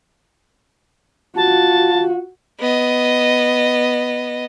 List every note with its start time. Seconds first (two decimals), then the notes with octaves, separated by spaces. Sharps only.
1.36 F4 F#4 A5
2.60 B3 D#5